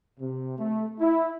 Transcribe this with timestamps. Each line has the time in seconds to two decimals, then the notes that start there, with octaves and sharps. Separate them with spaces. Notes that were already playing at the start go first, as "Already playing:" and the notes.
0.20 C3
0.57 A3
1.00 E4